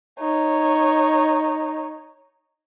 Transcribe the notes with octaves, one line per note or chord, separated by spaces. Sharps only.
D#4 C#5